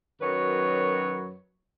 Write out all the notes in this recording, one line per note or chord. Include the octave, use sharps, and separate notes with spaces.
F#2 D#3 F#3 B4 C#5